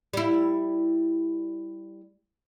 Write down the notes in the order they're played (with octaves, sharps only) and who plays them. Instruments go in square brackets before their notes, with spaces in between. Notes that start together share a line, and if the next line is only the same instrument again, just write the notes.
[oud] G3 E4